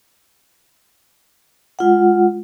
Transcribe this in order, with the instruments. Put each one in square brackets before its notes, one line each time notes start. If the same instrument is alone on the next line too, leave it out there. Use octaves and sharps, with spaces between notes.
[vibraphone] G#3 F4 F#5